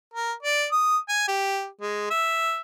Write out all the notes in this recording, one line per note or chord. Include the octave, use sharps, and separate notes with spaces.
A#4
D5
D#6
G#5
G4
G#3
E5